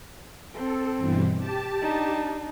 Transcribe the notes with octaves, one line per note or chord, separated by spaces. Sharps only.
C4 A4
G2 B2 E3
G4 A5
D4 D#4